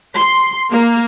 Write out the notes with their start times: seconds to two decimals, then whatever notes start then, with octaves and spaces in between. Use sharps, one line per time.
0.16 C6
0.72 A#3